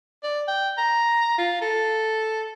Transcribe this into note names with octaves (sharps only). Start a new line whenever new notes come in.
D5
G5
A#5
F4
A4